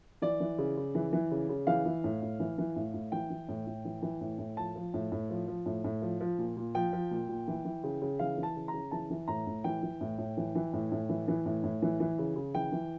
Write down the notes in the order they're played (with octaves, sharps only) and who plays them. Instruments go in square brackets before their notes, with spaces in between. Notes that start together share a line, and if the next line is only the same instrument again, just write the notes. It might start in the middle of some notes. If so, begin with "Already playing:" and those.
[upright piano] E3 D5
E3
C#3
C#3
E3
E3
C#3
C#3
E3 F5
E3
A2
A2
E3
E3
A2
A2
E3 G5
E3
A2
A2
E3
E3
A2
A2
F3 A5
F3
A2
A2
F3
F3
A2
A2
F3
F3
A#2
A#2
F3 G5
F3
A#2
A#2
E3
E3
C#3
C#3
E3 F5
E3
A5
C#3
A#5
C#3
E3 A5
E3
A2 A#5
A2
E3 G5
E3
A2
A2
E3
E3
A2
A2
E3
E3
A2
A2
E3
E3
C#3
C#3
E3 G5
E3